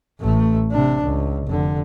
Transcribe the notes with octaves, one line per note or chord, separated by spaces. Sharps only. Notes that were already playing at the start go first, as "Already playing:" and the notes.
A1 A3
C3 D4
C#2
F1 D3